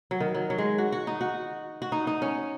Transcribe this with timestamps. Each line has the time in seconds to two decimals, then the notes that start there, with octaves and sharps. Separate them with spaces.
0.11 F#3
0.20 D#3
0.35 F#3
0.50 F#3
0.58 G#3
0.78 F#4
0.92 F#4
1.07 D#4
1.21 F#4
1.82 F#4
1.92 D#4
2.07 D#4
2.22 C#4